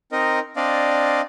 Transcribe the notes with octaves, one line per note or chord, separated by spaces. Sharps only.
C4 D#4 A#4 D#5
C4 D4 D5 D#5 F5